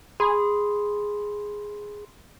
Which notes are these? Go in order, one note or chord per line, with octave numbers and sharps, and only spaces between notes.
G#4 B5 C6